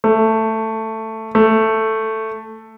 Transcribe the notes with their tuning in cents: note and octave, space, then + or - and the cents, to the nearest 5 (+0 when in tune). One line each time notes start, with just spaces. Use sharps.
A3 +10
A3 +5